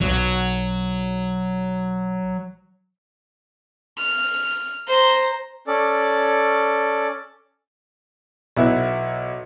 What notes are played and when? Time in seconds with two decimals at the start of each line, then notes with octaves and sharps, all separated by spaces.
0.01 B1 F#3
3.98 F6
4.88 C5 A#5
5.67 C#4 A4 D5
8.57 B1 B3 E4 E5